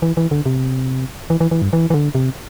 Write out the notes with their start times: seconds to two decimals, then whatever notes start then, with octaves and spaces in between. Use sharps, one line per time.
0.02 E3
0.17 E3
0.31 D3
0.46 C3
1.30 E3
1.40 E3
1.51 E3
1.62 G2
1.73 E3
1.90 E3
1.94 D3
2.15 C3